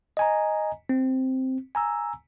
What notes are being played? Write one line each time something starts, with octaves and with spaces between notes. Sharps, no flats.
D#5 G#5 A#5
C4
G#5 A#5 E6